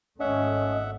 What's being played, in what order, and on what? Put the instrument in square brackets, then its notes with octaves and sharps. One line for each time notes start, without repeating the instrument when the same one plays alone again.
[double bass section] G#1 A3 [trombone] C#4 [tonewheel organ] D#5 [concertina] E5 F#5